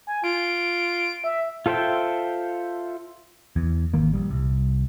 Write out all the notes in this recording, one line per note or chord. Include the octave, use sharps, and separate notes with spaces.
G#5
F4 D7
E5
F4 A4 C5 E5 G5
E2
G#1 D#3 A#3
A#1 G3
C2